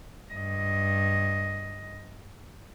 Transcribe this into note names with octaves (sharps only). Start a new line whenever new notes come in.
G2 D#5